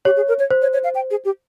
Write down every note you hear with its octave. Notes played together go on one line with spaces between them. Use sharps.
G4 C#5
G#4
A#4
C#5
C5
C#5
C#5
F5
G5
G#4
G4